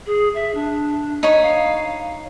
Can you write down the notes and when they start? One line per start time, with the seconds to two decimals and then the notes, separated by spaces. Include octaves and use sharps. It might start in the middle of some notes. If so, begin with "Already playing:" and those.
0.06 G#4
0.35 E5
0.55 D4
1.23 D#4 C#5 B5
1.42 F5